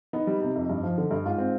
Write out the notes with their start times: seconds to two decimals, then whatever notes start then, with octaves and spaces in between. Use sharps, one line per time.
0.13 B3 D#4
0.27 G3
0.41 C3
0.56 F2
0.70 G2
0.83 F3
0.98 D3
1.11 G2
1.25 G#2 F4
1.38 C4